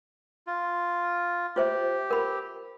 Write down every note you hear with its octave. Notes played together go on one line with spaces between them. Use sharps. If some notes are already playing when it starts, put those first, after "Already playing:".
F4
F4 G4 C5 E5
A#4 B5